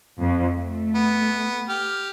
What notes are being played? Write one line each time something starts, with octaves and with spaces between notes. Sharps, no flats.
F2
A3
B3
G4 F6